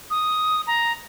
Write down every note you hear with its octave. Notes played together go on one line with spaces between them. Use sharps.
D#6
A#5